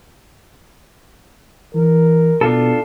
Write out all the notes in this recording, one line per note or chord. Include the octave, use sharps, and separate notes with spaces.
E3 A#4
B2 D4 F4 A4